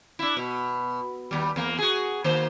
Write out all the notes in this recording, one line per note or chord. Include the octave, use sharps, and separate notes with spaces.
D4 E4
B2
D#2 G3
E2 A#3
F#4 G#4
D#3 A#3 C5